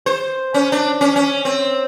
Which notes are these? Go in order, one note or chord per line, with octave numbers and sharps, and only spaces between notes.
C5
C#4
D4
C#4
C#4
C4